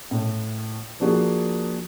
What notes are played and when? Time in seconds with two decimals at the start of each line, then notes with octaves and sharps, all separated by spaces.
0.11 A2
1.00 F3 A#3 D4 F#4 G#4